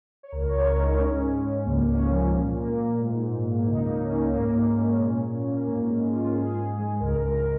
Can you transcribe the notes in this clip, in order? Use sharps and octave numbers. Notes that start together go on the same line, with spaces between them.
C#5
C#2 A#4
C#5
C#2
A#4
G#3
D#4
G#2 C#4
G#3
G#2
C#2 A#3
A#3 C#4
F3
A#2
A#3
A#2
G#2
G#2
A#3
C#2 D#4
A#3
C#2
C#4
A#3
C#4
G#2 A#3
G#2
C#4
G#3
A#2
A#2
A#3
G#2 A#3
G#3 C#4
G#2 F4
G#2 G#4
G#2
G#3
C#2 A#4
A#4
C#2
A#4